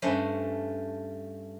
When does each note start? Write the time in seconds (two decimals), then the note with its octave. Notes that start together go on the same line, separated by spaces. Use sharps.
0.02 G2 A3 C#4 C5 B5